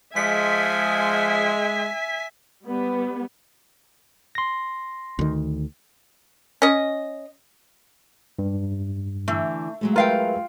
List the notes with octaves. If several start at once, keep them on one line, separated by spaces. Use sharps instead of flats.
F3 G#3 E5 G#5 B6
G3 B3
C6 A#6
D2 D#3
C#4 D#5
G2
D3 E3 A3
F#3 G#3 A3
F4 A#4 B4 E5 F5 G5